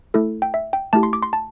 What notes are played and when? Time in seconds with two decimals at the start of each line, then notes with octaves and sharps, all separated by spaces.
0.14 A3 E4 A4
0.42 G5
0.54 E5
0.73 G5
0.93 A3 E4 G4 A5
1.03 C6
1.13 D6
1.23 C6
1.33 A5